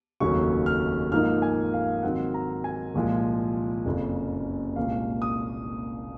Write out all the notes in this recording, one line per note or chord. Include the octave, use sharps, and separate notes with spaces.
F1 D#2 C#3 F#3 C#4 C#6
F6
G#2 F3 A#3 D#4 F6
G#5
F5
G#2 D#3 F#3 C4 F#5
A#5
G#5
C2 A#2 F3 G#3
F#1 F2 C#3
C2 A#2 G#3 F5
D#6